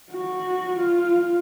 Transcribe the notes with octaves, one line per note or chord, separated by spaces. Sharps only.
F#4
F4